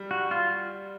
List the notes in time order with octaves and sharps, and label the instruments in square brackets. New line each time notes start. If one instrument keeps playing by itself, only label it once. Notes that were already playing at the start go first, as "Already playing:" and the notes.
Already playing: [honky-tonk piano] G3
[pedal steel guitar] F#4
F4